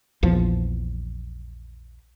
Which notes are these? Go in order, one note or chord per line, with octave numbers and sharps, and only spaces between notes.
A#1 E2 F3